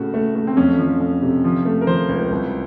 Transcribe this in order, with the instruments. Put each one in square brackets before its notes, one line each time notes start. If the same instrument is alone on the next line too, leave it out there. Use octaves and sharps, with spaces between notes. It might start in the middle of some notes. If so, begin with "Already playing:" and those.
Already playing: [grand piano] A2 C#3 A3 F#4
A3
A3
C4
F2 C#4
F3
F2
C3
F3
A3
A#4
F3 C5
C#2
C2